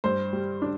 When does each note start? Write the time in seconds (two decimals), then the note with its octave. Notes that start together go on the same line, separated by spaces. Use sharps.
0.04 G2 C5
0.33 G3
0.62 D4